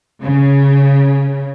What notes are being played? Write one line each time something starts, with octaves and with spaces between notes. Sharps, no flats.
C#3